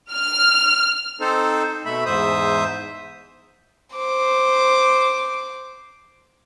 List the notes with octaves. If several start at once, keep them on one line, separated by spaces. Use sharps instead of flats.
F6
C4 D#4 A4 C5
B2 A3 E5 B5
E2 G#2 C5 E5 D#6
C5 D6